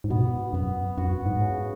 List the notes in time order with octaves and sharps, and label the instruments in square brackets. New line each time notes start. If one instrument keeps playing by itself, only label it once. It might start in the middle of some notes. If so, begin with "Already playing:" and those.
[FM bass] G#2
[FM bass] B2 [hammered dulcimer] B3
[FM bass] F#2 [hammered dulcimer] B3
[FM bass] F#2 [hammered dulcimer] F#4
[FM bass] G#2
[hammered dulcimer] C#3